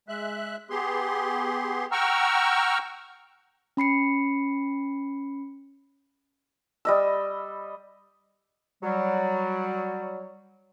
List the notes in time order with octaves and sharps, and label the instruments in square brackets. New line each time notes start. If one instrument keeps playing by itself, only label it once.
[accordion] G#3 E5 F#6
B3 G4 G#4 C6
F#5 G5 A#5 C#6 E6 F6
[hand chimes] C#4 B5 C7 C#7
[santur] G3 D#5 E6
[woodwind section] F#3 G3